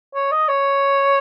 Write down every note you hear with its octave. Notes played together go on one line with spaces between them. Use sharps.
C#5
D#5
C#5